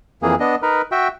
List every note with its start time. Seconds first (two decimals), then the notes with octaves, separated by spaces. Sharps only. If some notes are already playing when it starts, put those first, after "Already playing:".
0.23 F2 E3 A#3 G#4
0.40 B3 D4 D#5
0.62 D#4 A#4 B4
0.92 F#4 E5 G5